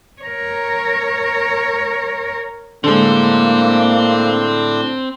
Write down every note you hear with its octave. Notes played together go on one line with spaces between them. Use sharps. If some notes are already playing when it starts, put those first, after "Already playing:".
A#4 C#5
A2 D3 G#3 A#3 C4 D4 C5